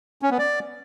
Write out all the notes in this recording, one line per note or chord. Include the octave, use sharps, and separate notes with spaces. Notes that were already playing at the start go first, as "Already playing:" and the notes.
C#4
B3
D5